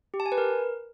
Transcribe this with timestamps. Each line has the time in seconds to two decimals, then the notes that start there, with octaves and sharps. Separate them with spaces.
0.14 G4
0.20 A5
0.26 G#5
0.32 B4
0.38 A#4